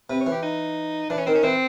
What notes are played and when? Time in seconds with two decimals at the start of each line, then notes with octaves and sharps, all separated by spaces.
0.10 C3 B4
0.21 C#5
0.27 E3
0.32 G4
0.42 D#4
1.10 E3 D4
1.18 C#4
1.26 D#3 C4
1.35 C#4
1.43 E3 C4